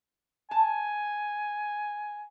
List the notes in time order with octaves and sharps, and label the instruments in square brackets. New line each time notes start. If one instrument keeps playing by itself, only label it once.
[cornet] G#5 [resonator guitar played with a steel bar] A5